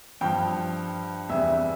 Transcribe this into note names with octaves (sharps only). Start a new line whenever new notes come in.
G2 F3 G5
E2 C3 E3 G3 E5